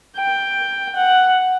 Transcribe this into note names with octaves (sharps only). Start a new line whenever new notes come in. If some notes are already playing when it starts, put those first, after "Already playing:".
G5
F#5